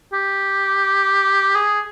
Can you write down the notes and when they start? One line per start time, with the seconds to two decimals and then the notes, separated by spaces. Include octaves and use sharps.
0.13 G4
1.55 G#4